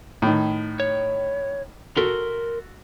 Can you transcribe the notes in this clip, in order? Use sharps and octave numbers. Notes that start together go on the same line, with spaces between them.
A2 D#3
C#5
F#4 A4 A#4 C6